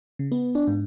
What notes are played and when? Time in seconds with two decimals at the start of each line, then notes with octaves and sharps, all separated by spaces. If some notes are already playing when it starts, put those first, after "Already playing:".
0.19 C#3
0.32 B3
0.55 D4
0.67 G#2